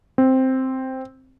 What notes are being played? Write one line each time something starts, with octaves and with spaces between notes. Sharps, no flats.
C4